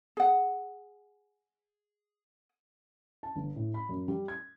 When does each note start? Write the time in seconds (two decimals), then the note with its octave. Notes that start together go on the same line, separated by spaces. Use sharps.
0.17 G#4 F#5
3.23 A5
3.36 G1
3.56 A2
3.74 B5
3.89 F#2
4.08 G3
4.28 G#6